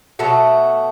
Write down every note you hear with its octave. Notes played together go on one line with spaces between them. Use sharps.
B2 F#3 A3 F#4 A4